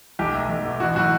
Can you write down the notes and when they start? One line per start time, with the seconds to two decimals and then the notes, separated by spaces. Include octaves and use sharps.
0.19 B1 G4
0.34 B2 A3
0.49 B1
0.64 B2 A3
0.80 A1 F#4
0.95 A2 F#3 F#4